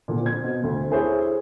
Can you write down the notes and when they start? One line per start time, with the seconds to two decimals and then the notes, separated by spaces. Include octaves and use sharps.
0.08 A#2 D3 F3
0.23 C4 G#6
0.44 B2
0.64 D2 C4
0.91 E4 G#4 A4 C5 C#5 E5